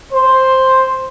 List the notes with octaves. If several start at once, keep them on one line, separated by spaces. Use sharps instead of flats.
C5